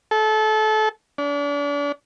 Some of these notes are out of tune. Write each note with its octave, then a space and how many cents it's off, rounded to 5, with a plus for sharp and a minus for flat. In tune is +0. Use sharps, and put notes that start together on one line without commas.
A4 -25
D4 -40